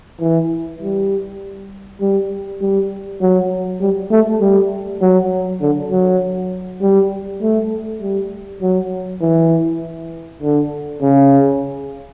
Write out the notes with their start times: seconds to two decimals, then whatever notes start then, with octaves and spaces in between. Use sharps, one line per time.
0.21 E3
0.81 G3
2.01 G3
2.61 G3
3.21 F#3
3.81 G3
4.11 A3
4.41 G3
5.01 F#3
5.61 D3
5.91 F#3
6.81 G3
7.42 A3
8.01 G3
8.62 F#3
9.21 E3
10.42 D3
11.02 C#3